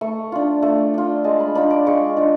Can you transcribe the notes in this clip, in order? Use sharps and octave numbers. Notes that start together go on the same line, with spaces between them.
A3 C#6
D4 F4
A3
D4 F4
G#3 A5
B5
D4 F4 B5
D6
G#3 C#6
D4 F4